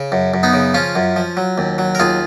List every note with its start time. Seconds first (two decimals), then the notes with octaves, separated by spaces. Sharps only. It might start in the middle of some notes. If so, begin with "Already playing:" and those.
Already playing: C#3
0.12 F#2
0.34 F#2
0.43 B3 D#4
0.53 C#3
0.74 F3 C#4 F4
0.96 F#2
1.16 F3
1.37 F#3
1.58 D#2
1.78 F#3
1.95 A#4
2.00 D#2 F4 G#4